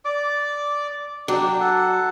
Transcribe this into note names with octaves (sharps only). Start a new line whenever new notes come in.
D5 D6
F#3 D4 G4
A4 F#5